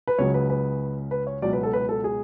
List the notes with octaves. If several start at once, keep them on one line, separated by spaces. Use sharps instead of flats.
B4
C#2 C#3 F#3 C#5
B4
B4
B4
C#5
C#2 B2 F#3 D5
B4
A4
B4
A4
G#4